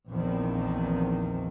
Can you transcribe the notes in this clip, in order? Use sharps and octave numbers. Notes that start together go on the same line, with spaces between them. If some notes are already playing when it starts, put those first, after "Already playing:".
A#1 E2 D#3 F3 C4